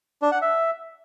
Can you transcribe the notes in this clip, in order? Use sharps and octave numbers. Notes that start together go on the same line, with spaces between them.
D4
F#5
E5